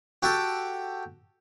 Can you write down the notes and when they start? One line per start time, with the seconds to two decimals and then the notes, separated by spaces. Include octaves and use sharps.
0.23 F#4 G4 A4 G5 A5